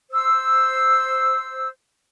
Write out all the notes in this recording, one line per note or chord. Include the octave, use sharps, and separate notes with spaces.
C5 E6